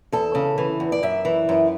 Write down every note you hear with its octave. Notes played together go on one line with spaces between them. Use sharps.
E2 A4
C#3
E3
E2
D5
F#2 E5
E3
F#2